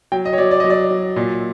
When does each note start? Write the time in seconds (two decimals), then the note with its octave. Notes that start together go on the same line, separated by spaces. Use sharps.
0.12 F#3 G5
0.25 D#5
0.33 C#5
0.38 F#3 D5
0.51 D5
0.60 F#3 D#5
0.70 D5
0.90 F#3
1.16 A#2